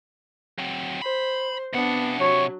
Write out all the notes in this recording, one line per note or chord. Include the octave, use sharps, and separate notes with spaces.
F#3 C4
C5 B5
C3 B3 D4 F#5
F#3 C#5